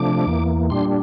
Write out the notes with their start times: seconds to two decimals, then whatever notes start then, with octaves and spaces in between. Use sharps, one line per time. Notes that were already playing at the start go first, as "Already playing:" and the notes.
Already playing: C3 F3 A3 D4 D6
0.27 E2 E3 A#3
0.70 A#2 G3 D4 C6